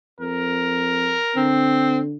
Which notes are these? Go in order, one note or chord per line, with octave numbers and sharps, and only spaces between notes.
F2 A#4
D3 C4